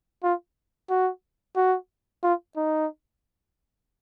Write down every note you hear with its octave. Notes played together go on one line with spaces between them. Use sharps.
F4
F#4
F#4
F4
D#4